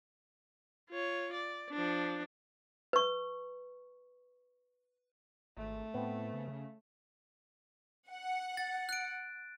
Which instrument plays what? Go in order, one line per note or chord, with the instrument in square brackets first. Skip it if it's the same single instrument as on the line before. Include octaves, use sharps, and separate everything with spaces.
[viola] F4 C#5
D5
F3 D4
[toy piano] B4 C#6
[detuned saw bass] G#1 [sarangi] A3
[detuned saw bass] A2 [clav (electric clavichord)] B3 C4
[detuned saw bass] C#3
[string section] F#5
[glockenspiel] A6
F#6 D7